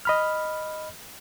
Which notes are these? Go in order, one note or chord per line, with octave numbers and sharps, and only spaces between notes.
D#5 B5 F6